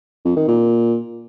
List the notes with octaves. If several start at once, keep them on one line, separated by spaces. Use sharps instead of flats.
F2
D#3
A#2